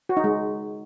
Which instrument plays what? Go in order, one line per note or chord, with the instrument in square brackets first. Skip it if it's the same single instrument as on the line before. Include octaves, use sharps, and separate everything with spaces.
[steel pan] F#4
D#4
G#3